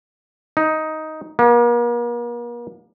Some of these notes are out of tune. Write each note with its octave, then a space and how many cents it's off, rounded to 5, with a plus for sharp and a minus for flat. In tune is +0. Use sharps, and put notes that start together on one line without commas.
D#4 +10
A#3 +40